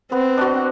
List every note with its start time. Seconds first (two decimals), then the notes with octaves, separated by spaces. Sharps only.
0.12 B3 C4
0.38 D4 F#4